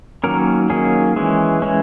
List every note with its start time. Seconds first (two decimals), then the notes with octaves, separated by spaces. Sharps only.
0.24 D#3 F#3 A#3 C#4 A#4
0.70 D#3 F#3 A#3 C#4 G#4
1.16 E3 G#3 C#4
1.62 E3 G#3 C#4